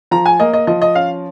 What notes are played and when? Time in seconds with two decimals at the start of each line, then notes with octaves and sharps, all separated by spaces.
0.11 F3 A#5
0.26 G#5
0.40 A#3 D#5
0.53 D#5
0.67 F3 D#5
0.82 D#5
0.95 C#4 F5